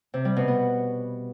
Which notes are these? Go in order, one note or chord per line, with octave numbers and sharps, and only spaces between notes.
C3
G3
B2
B3